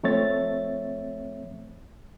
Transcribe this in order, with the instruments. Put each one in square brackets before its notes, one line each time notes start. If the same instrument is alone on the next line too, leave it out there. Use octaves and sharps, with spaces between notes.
[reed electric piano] F3 A3 C4 C#5 E5 A6